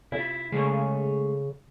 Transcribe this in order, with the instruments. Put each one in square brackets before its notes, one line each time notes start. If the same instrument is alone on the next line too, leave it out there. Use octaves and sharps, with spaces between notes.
[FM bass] C3 [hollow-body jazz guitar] E4 F4
[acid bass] C#3 [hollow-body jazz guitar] G#3 A3 C#4